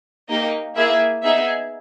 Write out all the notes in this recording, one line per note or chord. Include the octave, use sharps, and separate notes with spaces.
A#3 D#4 G4 D#5
A#3 E4 G#4 E5
B3 D#4 G#4 E5